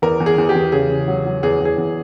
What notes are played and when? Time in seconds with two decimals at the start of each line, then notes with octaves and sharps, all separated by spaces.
0.02 E2 A#4
0.20 E2
0.26 G#4
0.38 E2
0.49 G4
0.55 E2
0.72 C#3 G#4
0.90 C#3
1.08 F#3
1.25 F#3
1.43 E2 G#4
1.60 E2
1.65 G#4
1.78 E2